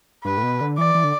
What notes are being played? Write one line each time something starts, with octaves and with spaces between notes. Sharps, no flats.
G2 B4
A2
B2
D3
E3 D5
E3
D3